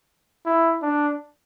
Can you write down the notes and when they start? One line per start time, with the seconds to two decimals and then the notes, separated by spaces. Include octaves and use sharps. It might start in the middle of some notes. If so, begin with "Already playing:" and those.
0.46 E4
0.82 D4